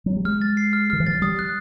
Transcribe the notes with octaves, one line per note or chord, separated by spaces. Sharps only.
F#3
G3
G#3 F6
A6
C7
F6
D#3 F6
E3
F3 A6
F#3
G3 D#6
F#6